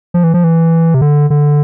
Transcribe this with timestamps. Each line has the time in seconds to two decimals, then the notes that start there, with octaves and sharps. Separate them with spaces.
0.14 F3
0.24 E3
0.34 F3
0.44 E3
0.94 C3
1.01 D3
1.30 D3